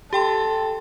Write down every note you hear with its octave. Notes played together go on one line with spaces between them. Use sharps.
G4 A4 G5 C6